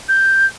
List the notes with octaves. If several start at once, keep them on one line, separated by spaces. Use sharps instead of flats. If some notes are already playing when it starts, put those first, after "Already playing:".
G6